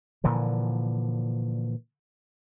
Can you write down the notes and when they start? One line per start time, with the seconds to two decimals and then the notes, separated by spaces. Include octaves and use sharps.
0.24 A#2 D3 E3 F3